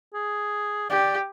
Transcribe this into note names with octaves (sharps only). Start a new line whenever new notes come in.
G#4
G4 D5